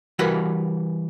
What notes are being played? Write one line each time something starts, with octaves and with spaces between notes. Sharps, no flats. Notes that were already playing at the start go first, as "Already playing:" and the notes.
E3 G3 F#4 A#4 B4